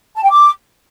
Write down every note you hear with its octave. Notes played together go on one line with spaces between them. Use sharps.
A5
G5
D6